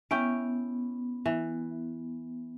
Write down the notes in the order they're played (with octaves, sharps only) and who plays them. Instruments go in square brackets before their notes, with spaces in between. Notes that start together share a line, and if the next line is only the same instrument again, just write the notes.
[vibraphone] B3 [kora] C#4 E4 G5
[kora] E3